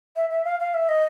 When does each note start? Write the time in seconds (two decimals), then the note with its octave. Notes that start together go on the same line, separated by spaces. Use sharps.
0.16 E5
0.30 E5
0.45 F5
0.60 F5
0.74 E5
0.89 D#5